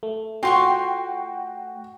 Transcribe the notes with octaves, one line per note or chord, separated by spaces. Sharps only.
A3
F4 F#4 G5 C6 C#6